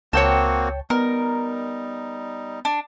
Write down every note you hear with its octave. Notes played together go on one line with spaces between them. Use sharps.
C#2 A#3 C4 F#4 C#5 G5 A5
G3 B3 D#4 A#4
D4